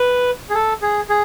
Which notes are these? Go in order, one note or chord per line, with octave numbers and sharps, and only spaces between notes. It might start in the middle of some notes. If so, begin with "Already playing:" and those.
Already playing: B4
G#4
A4
G#4
G#4